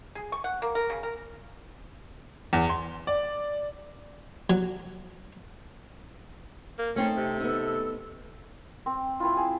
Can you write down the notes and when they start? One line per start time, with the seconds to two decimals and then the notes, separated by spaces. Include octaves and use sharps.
0.15 G#4
0.32 C#6
0.44 F#5
0.62 A#3
0.75 A#4
0.90 C#3
1.03 A#4
2.53 E2
2.69 C6
3.07 D5
4.50 F#3
6.78 A#3
6.96 A3 C4 C#4 D#4 A4
7.17 C3
7.40 B3 D#4 A4 E6
8.86 C4
9.20 C4 E4 F4
9.37 G#4